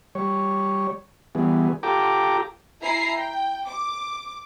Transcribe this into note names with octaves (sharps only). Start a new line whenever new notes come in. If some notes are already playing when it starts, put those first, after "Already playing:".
G3 C#5
E3 G3 B3 G#4
F4 G4 A4 G5 A#5 D6
E4 G#5 A#5 C7
G5
D6